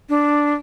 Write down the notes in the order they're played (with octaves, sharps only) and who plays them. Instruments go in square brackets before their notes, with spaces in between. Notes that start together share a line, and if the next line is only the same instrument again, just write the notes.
[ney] D4